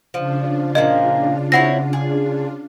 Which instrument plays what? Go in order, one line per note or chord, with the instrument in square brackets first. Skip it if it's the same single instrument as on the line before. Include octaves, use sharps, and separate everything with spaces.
[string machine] C#3 D4 F4 [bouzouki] F3
[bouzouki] A#2 F3 A#3 [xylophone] D#5
[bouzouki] C4 E4 C#5 [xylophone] F#5 A#6
[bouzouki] G#4